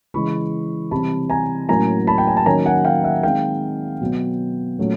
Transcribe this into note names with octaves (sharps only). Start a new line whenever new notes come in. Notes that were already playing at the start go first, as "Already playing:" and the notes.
C#3 E3 G#3 C#4 B5 C#6
C3 E3 G3 C4 A5 B5
G#5 A#5
A2 F#3 A#3 C#4 G#5 A#5
A5 B5
G5
G#5
A5
D#3 F#3 A#3 C#4 G#5 A#5
F#5 G#5
F5 G5
E5 F#5
D#3 G#3 C4 F5 G5
B2 F#3 B3
A#2 F#3 A3 C#4